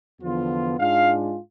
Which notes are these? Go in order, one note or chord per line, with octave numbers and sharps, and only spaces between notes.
E2 D3 F3 B3 F4
G#2 G#3 D4 F4 F5